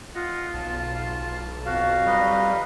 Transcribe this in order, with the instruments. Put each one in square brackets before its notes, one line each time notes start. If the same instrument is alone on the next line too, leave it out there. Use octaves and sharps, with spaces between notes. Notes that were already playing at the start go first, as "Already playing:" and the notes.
[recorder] F4 [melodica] D#5 F#5
[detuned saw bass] B1 [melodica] A5
[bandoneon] F2 F5 [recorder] F#4
[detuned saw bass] G3 [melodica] D#4 B4 D#5